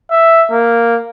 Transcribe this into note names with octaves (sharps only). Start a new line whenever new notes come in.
E5
A#3